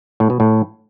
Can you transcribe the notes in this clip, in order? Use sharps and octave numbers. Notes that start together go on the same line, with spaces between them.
A2
B2
A2